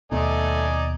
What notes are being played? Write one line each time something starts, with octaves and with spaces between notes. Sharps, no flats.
D#2 B2 A3 D#4 D5 G#5